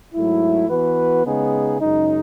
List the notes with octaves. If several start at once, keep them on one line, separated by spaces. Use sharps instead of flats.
G#2 F#3 A3 E4
E3 B3 F#4 B4
C#3 G#3 B3 D#4 G#4
F#2 C#3 G#3 D#4